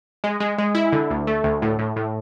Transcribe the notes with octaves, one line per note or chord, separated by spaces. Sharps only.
G#3
G#3
G#3
E4
D3
D2
A3
D2
A2
A2
A2